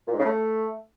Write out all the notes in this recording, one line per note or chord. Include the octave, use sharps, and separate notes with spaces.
A#2
G#2
C#3
A3